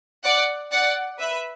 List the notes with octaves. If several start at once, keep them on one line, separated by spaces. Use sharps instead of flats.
D5 F#5
D5 F#5
B4 E5